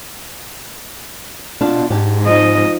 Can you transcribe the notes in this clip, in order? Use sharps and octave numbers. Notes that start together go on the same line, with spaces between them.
B2 D4 F4
G#2 G4
F3 D#4 D#5